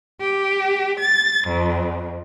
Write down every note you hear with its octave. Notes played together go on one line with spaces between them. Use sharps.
G4
A6
F2